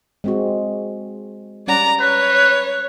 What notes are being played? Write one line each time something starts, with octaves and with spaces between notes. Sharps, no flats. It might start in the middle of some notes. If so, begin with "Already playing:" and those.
G#3 C4 F#4
G3 C#4 D5 F#5 A#5
B4 C#5